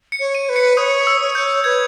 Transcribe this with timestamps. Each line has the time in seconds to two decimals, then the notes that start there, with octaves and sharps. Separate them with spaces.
0.12 C#7
0.20 C#5
0.35 D#7
0.49 B4
0.56 C#7
0.77 C#5 D#6
1.07 E6
1.21 C#5
1.35 G6
1.64 B4 G#6